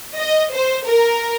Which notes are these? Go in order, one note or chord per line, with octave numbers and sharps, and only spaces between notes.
D#5
C5
A#4